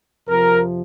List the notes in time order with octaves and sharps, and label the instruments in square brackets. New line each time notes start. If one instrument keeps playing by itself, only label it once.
[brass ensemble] F2 C3 F3 A#4